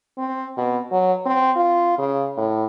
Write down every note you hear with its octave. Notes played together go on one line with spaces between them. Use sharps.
C4
B2
F#3
C4
F4
C#3
A2